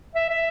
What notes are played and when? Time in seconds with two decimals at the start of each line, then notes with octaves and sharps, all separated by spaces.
0.15 E5
0.30 E5